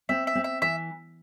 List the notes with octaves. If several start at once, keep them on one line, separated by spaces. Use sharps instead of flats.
C4 E5
E5
C4
E5
E3 E5